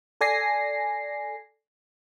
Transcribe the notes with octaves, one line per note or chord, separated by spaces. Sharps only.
A4 D5 G#5 A#6 C7